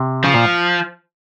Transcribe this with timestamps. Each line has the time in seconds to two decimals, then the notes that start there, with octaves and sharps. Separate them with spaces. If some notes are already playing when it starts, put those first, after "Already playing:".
Already playing: C3
0.24 C#3 F3
0.34 A#2